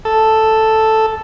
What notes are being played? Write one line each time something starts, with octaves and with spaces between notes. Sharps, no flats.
A4